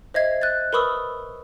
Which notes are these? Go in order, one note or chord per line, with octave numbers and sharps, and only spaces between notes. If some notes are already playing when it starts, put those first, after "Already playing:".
C5 D#5 E5 G#6 C7
F#6 G6 A6
A#4 B4 B5 C#6 D#6 E6